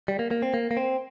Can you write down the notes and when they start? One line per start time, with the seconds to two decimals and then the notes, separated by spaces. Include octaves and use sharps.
0.08 G3
0.19 A#3
0.31 A#3
0.42 C4
0.54 A#3
0.71 A#3
0.77 C4